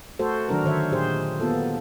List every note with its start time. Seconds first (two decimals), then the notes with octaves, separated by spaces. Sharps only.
0.19 A3 F#4 A4 C5
0.49 D#3 F#3 D4 F#4 A#4
0.64 D3 D#3 C5 C#5 E5
0.92 A#2 G4 G#4 C5
1.40 A#3 B3 F4 A4